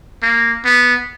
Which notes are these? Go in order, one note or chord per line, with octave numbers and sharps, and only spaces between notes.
A#3
B3